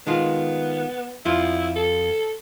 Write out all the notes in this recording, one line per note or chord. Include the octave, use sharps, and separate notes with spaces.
D#3 G#3 B3 F4
F2 E4 F4
A4